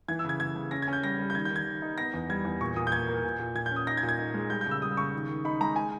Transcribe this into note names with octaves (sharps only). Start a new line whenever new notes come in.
E3 G#6
E6
C#3 G#6
C#3 G#6
C#3
C#4 A#6
G#6
C#4 G6
G3 A#6
G3
G6
D#3 G#6
G6
D#3
G#6
D#3
D#4
B3 A#6
E2
G3 G#6
E2
A#2 C#6
A#2 D#6
G6
A#3 G#6
A#3
A#2
A#2
A#2 G#6
G6
C#4
D#6
D#4 A#6
G#6
A#2
G#6
D#4
G#3
G3 G6
G6
C#3
E6
G3 D#6
C#3 C#6
D#3
D#3
D#4 B5
G#3 A#5
G#5